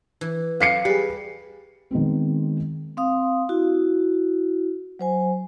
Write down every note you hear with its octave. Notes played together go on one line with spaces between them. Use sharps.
E3
F#3 F5 C7 C#7
G3 G4 G#4 B4
D#3 G#3 B3 C4
C4 F5 D#6
E4 F#4
F#3 C5 G#5